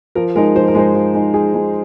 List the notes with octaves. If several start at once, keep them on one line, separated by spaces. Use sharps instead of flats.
F3 A#4
G#3 D#4 A#4
F3 C5
A#4
G#3 D#4 C5
F3
G#3 D#4
F3 G#4
G#3 D#4